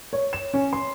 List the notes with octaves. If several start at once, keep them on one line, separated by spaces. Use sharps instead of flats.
C#5
E7
C#4
C6